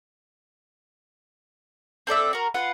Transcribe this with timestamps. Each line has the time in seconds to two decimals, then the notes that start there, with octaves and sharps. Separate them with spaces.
2.07 C4 A4 D5 E5
2.33 F#4 A#4
2.54 F4 B4 F#5